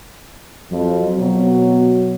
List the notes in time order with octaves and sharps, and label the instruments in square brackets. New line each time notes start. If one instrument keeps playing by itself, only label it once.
[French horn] F2 [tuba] F#3
[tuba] B2 [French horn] F#3